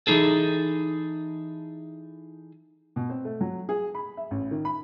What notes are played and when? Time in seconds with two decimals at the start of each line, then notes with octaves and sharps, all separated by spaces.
0.07 E3 G#3 D#4 G#4 A4
2.96 B2
3.09 C4
3.25 A3
3.41 F#3
3.69 G#4
3.95 B5
4.17 E5
4.31 A1
4.51 D#3
4.65 B5